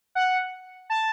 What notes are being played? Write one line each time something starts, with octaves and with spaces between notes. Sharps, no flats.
F#5
A5